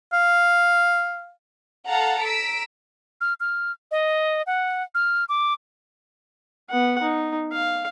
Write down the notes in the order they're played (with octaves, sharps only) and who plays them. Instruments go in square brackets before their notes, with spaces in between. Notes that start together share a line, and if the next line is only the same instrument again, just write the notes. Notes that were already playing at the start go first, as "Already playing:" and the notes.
[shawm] F5
[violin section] A4 F5 F#5 A5 A#5
A#5 E6 B6 D7
[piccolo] F6
F6
D#5
F#5
F6
D6
[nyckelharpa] B3 F#5
D#4
F5